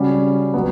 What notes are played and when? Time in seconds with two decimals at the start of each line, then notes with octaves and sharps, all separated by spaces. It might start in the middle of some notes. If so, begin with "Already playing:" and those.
Already playing: C#3 G3 C#4 F#4
0.54 B2 F#3 B3